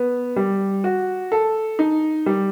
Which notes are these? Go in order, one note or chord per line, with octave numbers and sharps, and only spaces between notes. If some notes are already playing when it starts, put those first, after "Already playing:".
Already playing: B3
G3
F#4
A4
D#4
G3